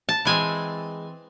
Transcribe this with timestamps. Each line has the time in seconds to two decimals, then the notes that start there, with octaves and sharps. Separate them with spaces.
0.09 A5
0.25 E3 G#3 C4 G#5